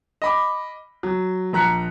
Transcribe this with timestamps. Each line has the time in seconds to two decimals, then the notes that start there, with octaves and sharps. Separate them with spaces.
0.22 D#5 B5 D6
1.03 F#3
1.53 A#1 A#5 F#6 B6 C#7